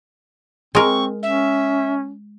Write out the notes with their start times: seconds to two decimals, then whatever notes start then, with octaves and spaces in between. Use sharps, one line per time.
0.75 G#3 C4 A#4 C#6
1.22 C#4 E5